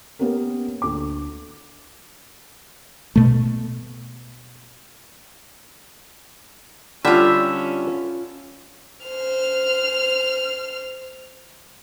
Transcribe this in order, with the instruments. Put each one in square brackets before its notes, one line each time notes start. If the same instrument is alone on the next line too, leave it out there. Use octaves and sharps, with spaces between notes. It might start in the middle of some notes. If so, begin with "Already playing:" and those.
[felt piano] A#3 B3 C#4 G4 A#4
D2 D6
[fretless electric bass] B2 A3
[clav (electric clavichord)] D3 G3 [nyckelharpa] C#4 [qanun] F4 E5
[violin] C5 F6